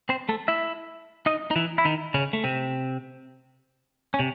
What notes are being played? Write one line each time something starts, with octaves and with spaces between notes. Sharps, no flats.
C4 C5
A3 A4
E4 E5
D#4 D#5
D#4
E3 E4
E4
D#3 D#4
C#3 C#4
A3
C3 C4
C#4
C3